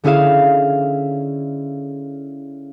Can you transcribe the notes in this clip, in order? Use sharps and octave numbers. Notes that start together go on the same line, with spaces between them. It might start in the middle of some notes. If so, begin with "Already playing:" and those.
D3 C#4 E4 G#4 F5 E7